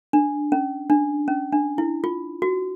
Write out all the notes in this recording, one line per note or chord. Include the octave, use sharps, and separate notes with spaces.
D4
C#4
D4
C#4
D4
E4
F4
F#4